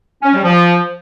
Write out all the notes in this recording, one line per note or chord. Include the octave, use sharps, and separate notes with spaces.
C#4
G3
F3